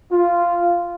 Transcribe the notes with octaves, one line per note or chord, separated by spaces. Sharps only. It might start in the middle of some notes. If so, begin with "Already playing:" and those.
F4